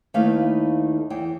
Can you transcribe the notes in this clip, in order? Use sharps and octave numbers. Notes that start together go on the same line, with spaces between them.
D#2 A3 D#4 E4 B4 F5
E2 G5